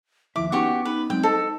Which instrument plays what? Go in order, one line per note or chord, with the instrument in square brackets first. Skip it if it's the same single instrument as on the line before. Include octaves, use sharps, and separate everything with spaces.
[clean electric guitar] D#2 F3 E5 [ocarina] E4 [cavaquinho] D6
[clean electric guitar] B3 C#4 [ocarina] D#4 [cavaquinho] F#4 G4 C#6
[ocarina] D#4 [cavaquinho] B4
[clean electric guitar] F#3 G#3 C4 [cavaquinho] G5
[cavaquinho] A4 [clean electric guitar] C5 D#5